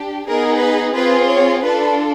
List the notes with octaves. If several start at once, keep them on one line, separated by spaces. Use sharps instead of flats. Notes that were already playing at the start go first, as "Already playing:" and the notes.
Already playing: D4 G4
B3 D#4 G#4 A#4
B4
C4 F4 G#4 B4
C#5
D4 F4 A4 B4